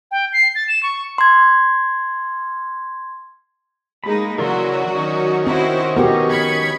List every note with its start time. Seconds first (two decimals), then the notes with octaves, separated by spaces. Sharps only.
0.11 G5
0.33 C7
0.55 A6
0.68 E7
0.83 C#6
1.18 C6 G#6
4.04 G#3 A#3 D#4 B5
4.38 C#3 E3 F#3 F#4 A#4 D5 C6
4.95 D#3 C#4
5.47 C4 E4 F#4 C5
5.97 B2 B3 F#4 G4 A#4
6.29 B5 G#6 C#7